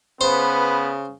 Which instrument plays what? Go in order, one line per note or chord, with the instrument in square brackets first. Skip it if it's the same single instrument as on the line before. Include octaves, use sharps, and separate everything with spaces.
[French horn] C#3 [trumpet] B3 [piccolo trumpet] B4 [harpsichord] C5